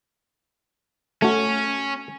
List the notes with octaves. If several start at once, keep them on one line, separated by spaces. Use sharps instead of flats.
A3 C#4 F#4